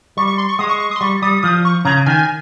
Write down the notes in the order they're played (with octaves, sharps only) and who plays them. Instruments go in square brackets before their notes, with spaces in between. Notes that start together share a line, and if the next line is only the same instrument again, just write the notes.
[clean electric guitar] G3 [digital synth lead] C#6
[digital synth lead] C#6
C6
C#6
[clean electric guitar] G#3 [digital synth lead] D#6
[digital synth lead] C#6
C#6
D#6
C6
[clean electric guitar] G3 [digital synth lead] C#6
[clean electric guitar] G3 [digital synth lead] D#6
[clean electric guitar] F3 [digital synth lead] D#6
[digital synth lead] C#6
[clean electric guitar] C#3 [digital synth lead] A#5
[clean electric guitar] D#3 [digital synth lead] G#5